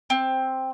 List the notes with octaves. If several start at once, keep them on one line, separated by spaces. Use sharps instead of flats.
C4